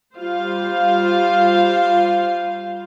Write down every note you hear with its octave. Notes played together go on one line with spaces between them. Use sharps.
G3 F4 C5 F5